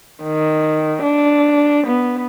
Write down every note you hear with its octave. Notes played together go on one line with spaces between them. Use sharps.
D#3
D4
B3